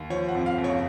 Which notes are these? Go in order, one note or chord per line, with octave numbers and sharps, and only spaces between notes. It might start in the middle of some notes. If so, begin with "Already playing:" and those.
Already playing: D#2
F3 C#5
F#5
F2
F5
F#1
C#5